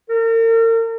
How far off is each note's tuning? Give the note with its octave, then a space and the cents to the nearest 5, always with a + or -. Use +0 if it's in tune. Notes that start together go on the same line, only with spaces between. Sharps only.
A#4 -40